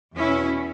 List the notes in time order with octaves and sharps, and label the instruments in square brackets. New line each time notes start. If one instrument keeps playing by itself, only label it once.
[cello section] E2 B2 C#4 E4